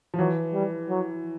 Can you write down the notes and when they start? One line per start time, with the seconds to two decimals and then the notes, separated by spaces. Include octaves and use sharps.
0.14 F3
0.18 E3 F#3
0.53 G3
0.89 F#3